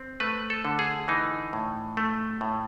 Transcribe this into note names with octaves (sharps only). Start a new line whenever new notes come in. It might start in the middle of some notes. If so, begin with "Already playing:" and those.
Already playing: C4
A3 B4
A4
D3
G#4
E3 D#4
A2
A3
A2